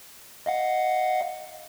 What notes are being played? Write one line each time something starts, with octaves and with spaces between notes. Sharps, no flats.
D#5 F5 F#5